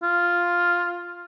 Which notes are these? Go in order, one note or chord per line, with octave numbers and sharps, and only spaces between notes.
F4